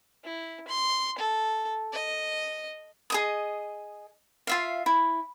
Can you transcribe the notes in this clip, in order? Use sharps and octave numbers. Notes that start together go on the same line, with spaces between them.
E4
C6
A4
D#5
G#4 D#5 D#6
F4 E5 F5
E4